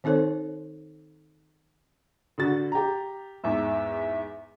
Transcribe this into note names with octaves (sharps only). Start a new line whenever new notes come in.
D#3 C4 D#4 A4 C5 C#5
D3 F#4 A6
G4 A#5
E2 G#2 E5